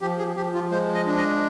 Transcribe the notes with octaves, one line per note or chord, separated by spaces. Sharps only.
F3 G4
G#4
F3 G4
F4
G#3 C5
D#5
D4
D#5